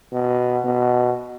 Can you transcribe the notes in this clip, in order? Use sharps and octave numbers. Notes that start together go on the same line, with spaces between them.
B2
B2